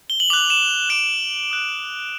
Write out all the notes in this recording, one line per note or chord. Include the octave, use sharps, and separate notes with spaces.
G7
F#7
D6 F#6 F7
E7
D6 F#6 D7
D#6 F#6